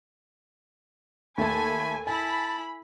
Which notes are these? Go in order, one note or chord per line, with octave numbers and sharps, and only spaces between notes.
D#2 A3 A4 G#5 A5 B5
E4 G#5 A5 B5